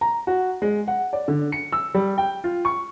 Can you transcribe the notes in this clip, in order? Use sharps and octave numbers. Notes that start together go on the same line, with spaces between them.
A#5
F#4
G#3
F#5
D5
D3
C#7
E6
G3
G5
F4
C#6